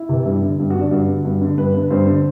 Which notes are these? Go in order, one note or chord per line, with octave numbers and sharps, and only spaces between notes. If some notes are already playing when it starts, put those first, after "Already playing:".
Already playing: E4
C3 E3
G2
D3
G2
F#4
D3
D4
G2 F#4
D3
G2
D3
G2 B4
D3 B4
G2 C5
D3